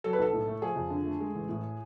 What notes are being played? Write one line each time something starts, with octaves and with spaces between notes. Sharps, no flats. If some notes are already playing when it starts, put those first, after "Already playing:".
F#3 A4
B4
B1 A4
A2
A3
F3 G#4
F2
D3
A3
G#3
A1
A2